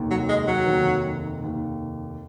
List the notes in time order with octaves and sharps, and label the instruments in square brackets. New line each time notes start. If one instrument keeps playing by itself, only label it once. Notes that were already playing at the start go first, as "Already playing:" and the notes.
Already playing: [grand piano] F1 D#2 D#3
[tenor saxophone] F#3
G#3
F#3
[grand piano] F1 D#2 D#3
F1 D#2 D#3